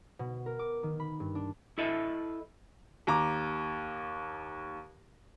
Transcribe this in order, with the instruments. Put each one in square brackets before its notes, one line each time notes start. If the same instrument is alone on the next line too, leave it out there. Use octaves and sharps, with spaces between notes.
[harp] B2
A#4
D6
D#3
B5
G2
D4
[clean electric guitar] E4 A4 B4 D#5 E5
[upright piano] D#2 A#5 D6